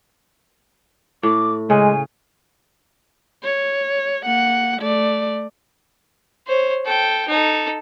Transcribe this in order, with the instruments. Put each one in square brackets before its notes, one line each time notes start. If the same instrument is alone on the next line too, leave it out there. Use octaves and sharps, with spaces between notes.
[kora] A2 [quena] D6
[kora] C#3 [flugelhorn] G#3 [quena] G#5
[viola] C#5
A#3 F#5
A3 D5
[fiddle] C5 C#5
A4 G5
D#4 A4